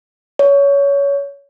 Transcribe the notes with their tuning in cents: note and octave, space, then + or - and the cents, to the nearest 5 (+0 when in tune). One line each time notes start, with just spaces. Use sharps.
C#5 +20